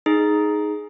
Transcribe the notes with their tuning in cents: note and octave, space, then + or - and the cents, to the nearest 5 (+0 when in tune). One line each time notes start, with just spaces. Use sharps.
D#4 +0 G#4 +10